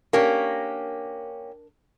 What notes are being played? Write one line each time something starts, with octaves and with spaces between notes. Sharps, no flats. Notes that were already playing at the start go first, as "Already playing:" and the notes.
A#3 C#4 D4 G4 A#4